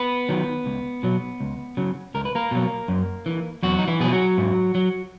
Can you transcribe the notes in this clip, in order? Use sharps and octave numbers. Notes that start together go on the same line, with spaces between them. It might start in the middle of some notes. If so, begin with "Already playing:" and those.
Already playing: B3 B4
D#3 F#3
C#2
B2 F#3
C#2
C#3 F#3
C#2 A#4
B4
A#3 A#4
B2 F#3
F#2
E3
E2 F#3 F#4
D#4
E3 E4
B2 F#3 G#4
F#3 F#4
G#2
F#3